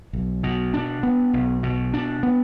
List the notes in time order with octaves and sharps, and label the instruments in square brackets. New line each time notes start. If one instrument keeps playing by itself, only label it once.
[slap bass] B1
B2
D4
B3
B1
B2
D4
B3